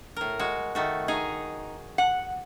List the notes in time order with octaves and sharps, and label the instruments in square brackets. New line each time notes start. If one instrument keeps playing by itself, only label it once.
[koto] A2 A#4
G#3 F#4
D#3 A3 F#4
[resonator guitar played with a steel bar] D#4 [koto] G#4
[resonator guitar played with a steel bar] F#5